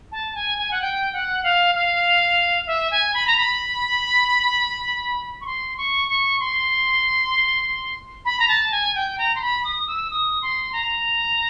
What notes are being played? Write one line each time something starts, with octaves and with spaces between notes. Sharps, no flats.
A5
G#5
G#5
F#5
G5
F#5
F5
F5
E5
G#5
B5
A#5
B5
C#6
C6
C#6
C#6
C6
B5
A#5
A5
G#5
G5
A#5
C6
B5
D#6
E6
D#6
C6
A#5